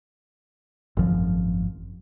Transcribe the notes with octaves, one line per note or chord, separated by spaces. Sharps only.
G#1 F#2 F3